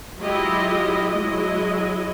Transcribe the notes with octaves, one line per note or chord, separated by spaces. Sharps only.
F#3 G#3 E4 F4 G4 D#5
F#3 G#3 E4 D#5